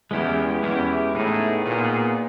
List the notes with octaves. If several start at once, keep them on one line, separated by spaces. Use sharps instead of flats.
E2 G#3 C#4 E4 G4
E2 G#3 C#4 E4 G4
A2 B3 D#4 G#4
A#2 B3 D#4 G#4